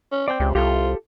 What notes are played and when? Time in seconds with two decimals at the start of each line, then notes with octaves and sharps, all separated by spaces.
0.12 C#4
0.28 C4 D5 G5
0.40 C#2 C3
0.55 C2 F4 G4 A4